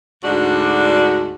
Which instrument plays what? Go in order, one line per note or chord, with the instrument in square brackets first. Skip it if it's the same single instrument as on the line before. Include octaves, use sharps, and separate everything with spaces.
[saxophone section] D2 G#2 D4 F#4 D5